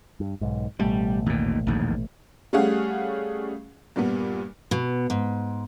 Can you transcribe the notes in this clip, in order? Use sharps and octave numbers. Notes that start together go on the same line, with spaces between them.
G2
B1 G#2
A1 B2 G3 A3
D#2 A#2
A#1 D#2 G#2
G3 A3 C#4 G#4 F5 F#5
G2 A#2 G3 B3
B2
G#2